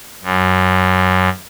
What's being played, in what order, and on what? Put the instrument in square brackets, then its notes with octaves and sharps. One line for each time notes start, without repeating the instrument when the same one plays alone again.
[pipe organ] F#2